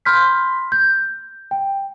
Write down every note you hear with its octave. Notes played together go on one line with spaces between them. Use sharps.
B5 C6 F6 G6 B6
G6
G5